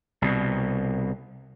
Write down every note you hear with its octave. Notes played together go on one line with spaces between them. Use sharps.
C2 B2